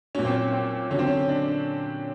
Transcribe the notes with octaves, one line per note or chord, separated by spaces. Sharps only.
A#2 F#3 C#4
C4
C#4
C4
D3 F#3 C#4
C4
C#4
D4